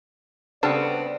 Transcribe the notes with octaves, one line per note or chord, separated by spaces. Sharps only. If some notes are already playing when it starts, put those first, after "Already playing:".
C#3 G3 B3 C4 D4 A4 D5